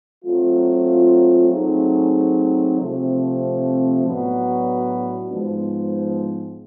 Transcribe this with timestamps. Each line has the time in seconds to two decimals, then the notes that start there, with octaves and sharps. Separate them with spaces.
0.24 F#3 A3 C4 F4
1.50 F#3 A3 C4 D#4 G#4
2.76 C3 F3 A3 C4
4.04 A2 F#3 B3 D4 F#4
5.29 G#2 F3 G#3 B3